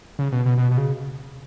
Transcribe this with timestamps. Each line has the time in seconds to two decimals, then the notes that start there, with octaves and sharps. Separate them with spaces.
0.19 C#3
0.32 B2
0.46 B2
0.58 B2
0.71 B2
0.77 C#3